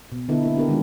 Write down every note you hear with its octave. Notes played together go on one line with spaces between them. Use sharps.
B2
D3 B3 D#4 E4 A4
A3 A#3 E4
B3 D4 F#4 G4 A4 A#4
D#3 E3 G#3 A3 D4 F4